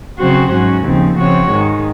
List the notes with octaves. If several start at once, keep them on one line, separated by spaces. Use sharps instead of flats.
C#3 F#3 C4 F#4 C5
G#2 F#3 C#4 F#4
D#2 C#3 F3 C4
C#3 F3 C4 F#4 C#5
G#2 D#3 G#3